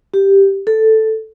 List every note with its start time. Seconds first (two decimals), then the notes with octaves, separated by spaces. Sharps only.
0.14 G4
0.67 A4